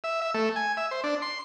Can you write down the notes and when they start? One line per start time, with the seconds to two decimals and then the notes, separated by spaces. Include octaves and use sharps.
0.04 E5
0.22 E5
0.34 A3
0.56 G#5
0.77 E5
0.91 C5
1.04 D4
1.22 C6